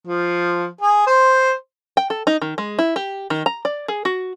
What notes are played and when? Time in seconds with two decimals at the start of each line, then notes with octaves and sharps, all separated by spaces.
0.07 F3
0.81 G#4
1.07 C5
1.97 G5
2.10 A4
2.27 D#4
2.42 D#3
2.58 G#3
2.79 E4
2.96 G4
3.30 D#3
3.46 A#5
3.65 D5
3.88 G#4
4.05 F#4